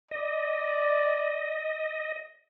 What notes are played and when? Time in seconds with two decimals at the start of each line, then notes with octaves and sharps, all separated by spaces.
0.11 D5 D#5